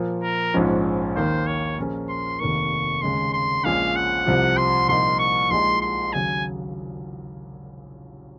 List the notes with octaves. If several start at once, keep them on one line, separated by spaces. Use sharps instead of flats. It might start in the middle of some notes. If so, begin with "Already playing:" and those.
Already playing: A#2 F3 A#3
A#4
A#1 G#2 F3 G#3 C#4
D#2 D#3 A#3 C5
C#5
A#2 F3 A#3 C#4 G#4
C6
F1 D#2 D#3 A#3 C#6
D#2 C#3 G#3 C#4 C6
C6
A#1 A#2 G#3 C#4 F5
F#5
C2 C3 F3
C6
C2 A#2 F3 A#3 D#4 C6
C#6
A#1 A#2 G#3 D#4 G#4 C6
C6
D#2 C#3 F#3 G#5